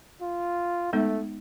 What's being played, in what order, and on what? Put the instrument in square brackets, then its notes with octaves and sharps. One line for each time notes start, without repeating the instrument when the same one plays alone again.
[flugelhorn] F4
[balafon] G#3 B3 D#4 [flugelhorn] A3